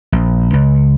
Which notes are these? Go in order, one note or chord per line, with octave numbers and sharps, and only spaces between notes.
A#1
C#2